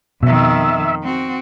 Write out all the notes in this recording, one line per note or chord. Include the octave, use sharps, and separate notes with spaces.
F2 B2 D#3 E5
C4 F#4